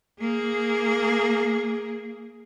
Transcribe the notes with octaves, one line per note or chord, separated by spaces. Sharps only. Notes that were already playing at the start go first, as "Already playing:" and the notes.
A#3 G#4